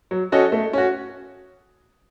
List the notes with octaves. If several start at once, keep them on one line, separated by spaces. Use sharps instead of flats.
F#3
C#4 F#4 A4 D#5
A3
C#4 F#4